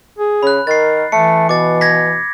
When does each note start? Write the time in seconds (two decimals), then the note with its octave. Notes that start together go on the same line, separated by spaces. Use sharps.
0.19 G#4
0.43 C#3 B5 F#6
0.67 D#3 A#4 A6 C7
1.12 E3 A3 C#7
1.49 B2 D6 A6
1.81 G#6 A#6 B6